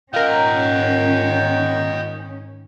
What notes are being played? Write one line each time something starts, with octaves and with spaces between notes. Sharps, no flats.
G#2 D#3 C#4 F4 A#4 D#5 F#5 G5